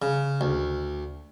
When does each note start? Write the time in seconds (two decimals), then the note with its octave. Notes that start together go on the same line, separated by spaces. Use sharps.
0.02 C#3
0.41 D2